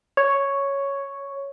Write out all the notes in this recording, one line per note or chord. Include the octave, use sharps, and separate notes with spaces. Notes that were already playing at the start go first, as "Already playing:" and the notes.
C#5